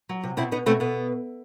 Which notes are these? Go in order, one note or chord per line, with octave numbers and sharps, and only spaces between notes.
F#3
C3
B2 C4 E4
B2 B3 D#4
B2 A3 C4
B2 B3